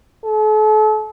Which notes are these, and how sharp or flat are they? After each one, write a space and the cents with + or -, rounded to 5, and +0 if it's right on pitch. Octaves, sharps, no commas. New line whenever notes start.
A4 -40